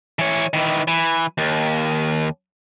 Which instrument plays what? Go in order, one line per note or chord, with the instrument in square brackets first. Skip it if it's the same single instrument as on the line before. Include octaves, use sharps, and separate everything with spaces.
[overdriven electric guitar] E3 C#5
D#3 E3
E3
D#2